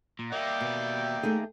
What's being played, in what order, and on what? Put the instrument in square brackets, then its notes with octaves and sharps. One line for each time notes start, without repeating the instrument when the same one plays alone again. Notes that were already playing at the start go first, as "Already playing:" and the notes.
[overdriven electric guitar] A#2
[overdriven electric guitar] A#3 G4 [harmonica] D5 E5 G5
[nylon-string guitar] B2
A3 D#4 G#4